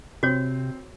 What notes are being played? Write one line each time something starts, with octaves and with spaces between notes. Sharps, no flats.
C3 C4 F#4 C#5